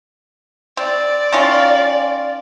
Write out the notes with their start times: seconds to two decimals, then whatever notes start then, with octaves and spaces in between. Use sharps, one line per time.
0.77 C4 D5
1.33 D#3 C#4 F4